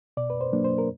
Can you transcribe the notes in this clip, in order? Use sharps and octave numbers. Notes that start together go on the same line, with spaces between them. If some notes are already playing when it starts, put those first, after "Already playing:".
B2 D5
B4
C5
F#3 A#3 D4
C5
A#4